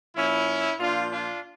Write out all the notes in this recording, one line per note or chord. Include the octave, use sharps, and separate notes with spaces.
A#2 F3 C#4 E4
A#2 F3 D4 F4
D4 F4